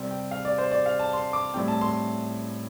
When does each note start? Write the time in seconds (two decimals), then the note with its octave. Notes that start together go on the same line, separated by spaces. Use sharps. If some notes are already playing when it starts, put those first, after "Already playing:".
Already playing: C3 G3 C4
0.11 G5
0.31 F5
0.45 D5
0.58 C5
0.72 D5
0.86 F5
0.99 A5
1.13 C6
1.33 D6
1.54 A2 G3 C4 G5
1.68 A5
1.81 C6